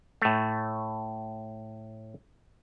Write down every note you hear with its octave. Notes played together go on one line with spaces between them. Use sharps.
A2 A3